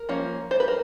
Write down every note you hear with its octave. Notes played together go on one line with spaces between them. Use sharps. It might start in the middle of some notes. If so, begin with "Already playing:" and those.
Already playing: A#4
F3 A#3 C#4
C5
B4
A#4